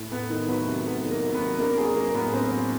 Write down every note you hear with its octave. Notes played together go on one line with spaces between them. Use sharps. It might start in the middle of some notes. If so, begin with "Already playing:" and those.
Already playing: A2
A3 B3 B4
D#3
F#3 B3 B4
C3
A3 B3 B4
D#3
A#3 A#4
F#3
B3 B4
C3
A#3 D4 A#4
F#3 G#4
A#3 A#4
A2 B3 B4
C4 D4 C5
F#3